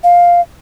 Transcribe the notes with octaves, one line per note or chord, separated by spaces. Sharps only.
F5